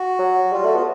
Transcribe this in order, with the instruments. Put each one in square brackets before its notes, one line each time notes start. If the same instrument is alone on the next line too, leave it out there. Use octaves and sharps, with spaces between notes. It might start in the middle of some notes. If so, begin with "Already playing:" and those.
Already playing: [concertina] F#4
[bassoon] F#3
[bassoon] G3 [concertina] F4
[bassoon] A3 [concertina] F#4
[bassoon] B3 [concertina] F4